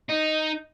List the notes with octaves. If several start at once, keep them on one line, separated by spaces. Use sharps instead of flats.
D#4